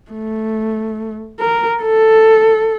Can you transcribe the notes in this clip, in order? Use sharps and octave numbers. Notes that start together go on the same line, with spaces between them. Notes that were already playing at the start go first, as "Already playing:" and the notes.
A3
A#4
A4